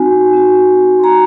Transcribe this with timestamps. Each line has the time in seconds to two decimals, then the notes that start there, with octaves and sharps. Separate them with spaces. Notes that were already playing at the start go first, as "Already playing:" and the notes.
Already playing: C4 D#4 F#4 G#5
0.33 C4 D#4 F#4
0.99 C6
1.04 A#5